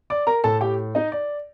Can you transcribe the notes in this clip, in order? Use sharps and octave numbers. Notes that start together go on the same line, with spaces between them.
D5 D6
A#4 A#5
A2 A4 A5
G4 G5
D#4 D#5
D5